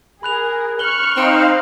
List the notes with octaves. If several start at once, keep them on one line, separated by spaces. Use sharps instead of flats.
G#4 A#4 B5 F#6 F7
C#6 F6 F#6 F#7 G7
C4 D#4 C5 F5